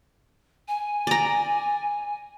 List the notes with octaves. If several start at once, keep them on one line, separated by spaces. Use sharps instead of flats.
G#5
D5 A#5